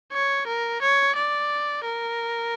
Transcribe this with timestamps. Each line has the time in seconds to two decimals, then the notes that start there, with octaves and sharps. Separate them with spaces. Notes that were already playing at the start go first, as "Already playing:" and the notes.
0.13 C#5
0.47 A#4
0.82 C#5
1.16 D5
1.84 A#4